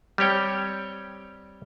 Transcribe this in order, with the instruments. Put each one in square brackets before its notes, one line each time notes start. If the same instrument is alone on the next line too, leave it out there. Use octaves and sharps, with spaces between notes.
[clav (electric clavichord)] G3 C4 G4 C#5 G5